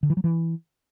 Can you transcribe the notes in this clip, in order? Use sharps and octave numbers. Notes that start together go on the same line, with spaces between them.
D3
E3
F#3
E3